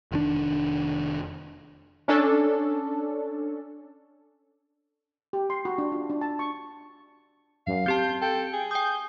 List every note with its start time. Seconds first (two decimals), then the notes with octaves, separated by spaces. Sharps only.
0.11 F1 D#3 D4
2.08 C#4 D4 A4
5.33 G4
5.50 C6
5.65 F#4
5.78 D4
5.92 F4
6.10 D4
6.21 A5
6.39 C#6
7.67 F#2 F5
7.86 C4 G4 A5 G6
8.21 A4 G5
8.53 G#4
8.71 G5 D#6 G6